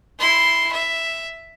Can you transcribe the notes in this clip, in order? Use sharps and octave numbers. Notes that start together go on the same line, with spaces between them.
E4 C6
E5